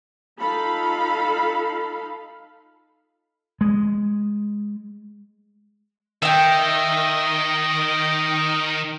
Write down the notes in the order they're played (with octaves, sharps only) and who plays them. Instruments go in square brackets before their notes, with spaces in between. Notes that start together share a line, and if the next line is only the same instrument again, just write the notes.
[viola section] D#4 F4 A4 F5 B5
[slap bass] G#3
[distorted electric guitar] D#3 [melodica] D#5 [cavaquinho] E5 G5